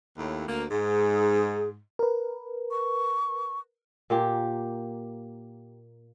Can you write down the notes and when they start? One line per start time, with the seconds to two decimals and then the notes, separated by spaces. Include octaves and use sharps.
0.18 D#2 A2
0.48 D2 A#3
0.70 G#2 G#4
1.99 A#4 B4
2.71 C#6
4.10 A#2 A#3 G4